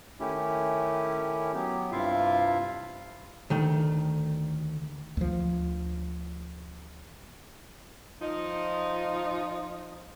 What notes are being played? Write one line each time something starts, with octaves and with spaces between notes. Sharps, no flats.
D#3 A3 C#4 E4 G4
F#3 B3 G4
G2 C3 E4 F4 E5 F5
D2 D#3 A3
D2 F3
F3 D#4